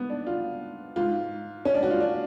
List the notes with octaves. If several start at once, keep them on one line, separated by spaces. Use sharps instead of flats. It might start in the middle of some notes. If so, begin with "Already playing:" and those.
Already playing: G#2 B3
D4
F4
G#2 F4
C#4
D4
F#4
F4
D4